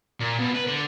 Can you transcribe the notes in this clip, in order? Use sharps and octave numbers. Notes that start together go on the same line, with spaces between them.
A#2
B2
B4
D3